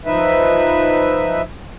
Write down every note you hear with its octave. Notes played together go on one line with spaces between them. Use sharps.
F3 D#4 B4 E5